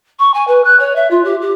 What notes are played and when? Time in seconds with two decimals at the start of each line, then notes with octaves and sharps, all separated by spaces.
0.19 C#6
0.34 G#5
0.47 B4
0.64 F#6
0.79 C#5
0.95 E5
1.10 F4
1.24 G4
1.41 G4